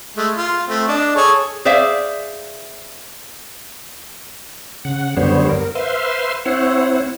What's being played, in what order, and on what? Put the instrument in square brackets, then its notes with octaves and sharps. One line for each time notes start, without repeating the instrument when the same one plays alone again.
[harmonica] G#3 A3
F4
A3 C4
D4 D#5
G#4 A4 C#5
[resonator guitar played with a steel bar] G#4 C5 D5 E5 F5
[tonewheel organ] C#3 F#5
F#2 D3 G3 B3 C5 C#5
A#4
B4 C5 E5 F5 C6
C4 E4 C5 C#5 F#5